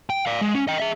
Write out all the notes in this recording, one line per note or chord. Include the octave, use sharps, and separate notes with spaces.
G5
D5 F5
G#3
C#4
D#5 G5
G#4 E5